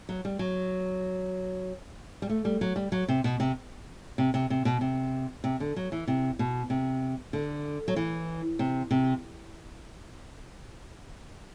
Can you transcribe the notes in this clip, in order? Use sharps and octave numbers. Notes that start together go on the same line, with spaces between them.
F#3
G3
F#3
G3
A3
G3
F#3
G3
F#3
C3
B2
C3
C3
C3
C3
B2
C3
C3
D3
F#3
E3
C3
B2
C3
D3
F#3
E3
C3
C3